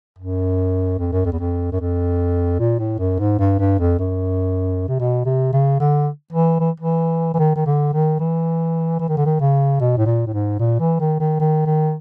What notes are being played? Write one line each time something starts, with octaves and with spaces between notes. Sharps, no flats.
F#2
F2
F#2
F2
E2
F2
F#2
F2
A#2
A2
F#2
G#2
G2
G2
F2
F#2
C3
B2
C3
C#3
D3
E3
E3
E3
E3
D#3
D#3
D3
D#3
E3
E3
D#3
D3
D#3
C#3
B2
A2
A#2
A2
G#2
A#2
E3
D#3
D#3
D#3
D#3